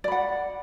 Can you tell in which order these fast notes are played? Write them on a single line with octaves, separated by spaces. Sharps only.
D5 B5 F#5